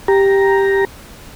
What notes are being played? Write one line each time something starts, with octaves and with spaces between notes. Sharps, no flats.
G4 A#5